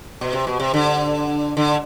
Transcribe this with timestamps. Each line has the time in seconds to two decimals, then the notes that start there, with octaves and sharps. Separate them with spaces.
0.21 B2
0.33 C3
0.47 B2
0.60 C3
0.74 D3
1.57 D3